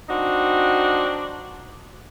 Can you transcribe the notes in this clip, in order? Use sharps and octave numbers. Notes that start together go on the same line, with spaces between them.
C4 D4 D#4 F#4